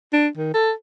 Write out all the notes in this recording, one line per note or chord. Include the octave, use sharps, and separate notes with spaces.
D4
D#3
A4